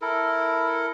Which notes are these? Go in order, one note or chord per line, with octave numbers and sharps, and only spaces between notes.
E4 A4 A#4